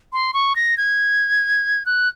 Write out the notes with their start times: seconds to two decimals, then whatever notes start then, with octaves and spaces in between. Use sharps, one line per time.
0.13 C6
0.34 C#6
0.56 A#6
0.77 G#6
1.86 F#6